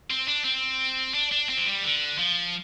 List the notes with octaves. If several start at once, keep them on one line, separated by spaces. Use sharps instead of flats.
C4
D4
C4
D4
D4
C4
F3
G3
D3
F3